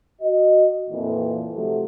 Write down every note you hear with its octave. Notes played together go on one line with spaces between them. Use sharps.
F#4 D#5
F2 A#2 E3
C3 F3 F#3 A3